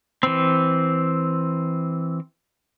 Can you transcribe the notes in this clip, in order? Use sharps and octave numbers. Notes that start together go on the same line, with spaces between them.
E3 C4